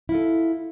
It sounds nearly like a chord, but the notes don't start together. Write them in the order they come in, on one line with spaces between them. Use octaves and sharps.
E4 F4 A4